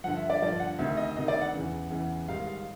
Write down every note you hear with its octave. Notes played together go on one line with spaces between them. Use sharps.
G2 D3 F3 F#5
E5
D5
G2 D3 F3 D5
F#5
D2 C3 D#3 E5
D#5
D2 C3 D#3 D#5
D5
F#5
E2 C#3 E3
E2 C#3 E3
G#2 D#3 G3 F5
F5